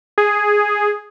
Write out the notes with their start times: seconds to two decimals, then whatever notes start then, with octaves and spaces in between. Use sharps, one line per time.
0.18 G#4